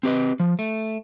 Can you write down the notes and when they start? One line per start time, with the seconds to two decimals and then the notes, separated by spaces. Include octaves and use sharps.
0.03 C4 G4 B4 D#5
0.40 F3
0.59 A3